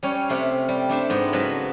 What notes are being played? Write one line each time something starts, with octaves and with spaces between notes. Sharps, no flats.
G3 C#4 C#5
C3 A3 F5
G3
A3 D4 C5
G#2 B3
C#3 F#3 G#3 B4 A5